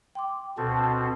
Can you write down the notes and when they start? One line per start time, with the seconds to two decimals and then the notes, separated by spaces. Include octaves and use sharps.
0.15 G5 C6 D6
0.57 D2 B2 C4 F#4 A4